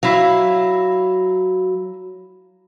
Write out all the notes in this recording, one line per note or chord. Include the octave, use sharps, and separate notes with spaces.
F#3 E4 F5